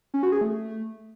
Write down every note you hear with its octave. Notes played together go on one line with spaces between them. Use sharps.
C#4
F#4
G#4
A3